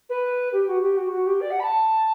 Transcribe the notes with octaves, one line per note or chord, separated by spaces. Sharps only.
B4
G4
F#4
G4
F#4
F#4
G4
D5
F#5
B5
A5